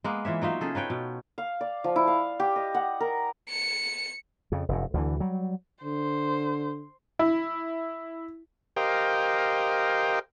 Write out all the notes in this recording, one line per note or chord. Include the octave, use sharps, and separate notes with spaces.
G#3 A#3 B3
E3 F4 C#5 E5
F#3 D#4 F4 E5
C#3 G#4 A4
D#4 B4 C#5 G5
B2
F5
D5
F3
E4
F5
G4
D#5
F#5
A#4
C#7
F2 C#3
F1 F#2
D2 D3 E3
F#3 G3
D3 C5
E4
G4 A#4 C5 D#5 F5 G5